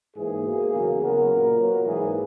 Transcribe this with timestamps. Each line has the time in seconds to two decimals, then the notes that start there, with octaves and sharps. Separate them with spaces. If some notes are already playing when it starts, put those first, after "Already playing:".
0.16 G#2 E3 A#3 G#4
0.44 B2 A#3
0.72 E2 C#3 F#3 A#3
1.01 C#3 F#3 B3 A#4
1.29 A#2 A#3
1.57 B2 F#3 B3
1.85 G#2 E3 A#3 G#4